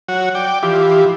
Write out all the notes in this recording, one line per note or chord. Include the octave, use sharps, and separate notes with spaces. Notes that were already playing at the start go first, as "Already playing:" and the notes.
F#3 F#4 C#5
D5 G5
E3 F3 G4